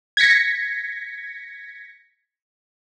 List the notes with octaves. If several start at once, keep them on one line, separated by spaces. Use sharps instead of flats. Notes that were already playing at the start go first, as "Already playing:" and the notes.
G#6 A#6 B6 C#7